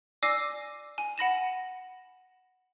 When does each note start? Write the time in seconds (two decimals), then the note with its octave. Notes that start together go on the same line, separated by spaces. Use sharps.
0.23 D5 G#5 D6 E6 A#6 C7
0.98 G#5
1.18 F#5 B5 A#6 E7